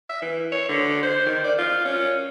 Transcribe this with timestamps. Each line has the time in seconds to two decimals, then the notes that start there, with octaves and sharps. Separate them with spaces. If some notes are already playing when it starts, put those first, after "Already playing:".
0.09 E5
0.22 E3
0.52 C#5
0.69 D3
1.03 C5
1.26 D#3
1.44 D5
1.58 F4
1.85 C#4